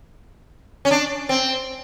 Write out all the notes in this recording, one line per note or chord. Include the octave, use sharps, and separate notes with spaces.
C#4
D4
C4